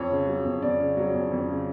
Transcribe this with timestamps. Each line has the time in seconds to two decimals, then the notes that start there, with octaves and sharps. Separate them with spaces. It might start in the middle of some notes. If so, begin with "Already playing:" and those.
Already playing: F2 C#5
0.11 C#3
0.27 F#3
0.45 F2
0.62 F2 D5
0.80 C#3
0.97 F#3
1.14 F2
1.32 F2
1.49 C#3